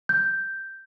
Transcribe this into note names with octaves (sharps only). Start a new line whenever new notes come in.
G6